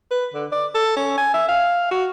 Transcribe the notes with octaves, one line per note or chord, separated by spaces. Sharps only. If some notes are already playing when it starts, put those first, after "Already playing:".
B4
D3
D5
A4
C#4
G#5
E5
F5
F#4